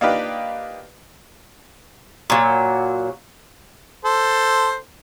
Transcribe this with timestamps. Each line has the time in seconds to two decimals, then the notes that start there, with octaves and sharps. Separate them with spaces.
0.01 A#3 D4 D#4 F4 G4 B4
2.30 A#2 F#3
4.05 A4 C5